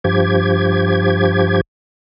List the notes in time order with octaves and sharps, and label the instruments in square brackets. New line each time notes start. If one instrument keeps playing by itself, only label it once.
[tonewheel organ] G2 F3 G4 G#6